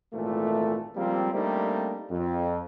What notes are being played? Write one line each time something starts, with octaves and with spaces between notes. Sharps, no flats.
G#1 A#2 E3 A3
C#2 F3 G3 A#3 C4
G3 A3 A#3 C4 D4 D#4
F2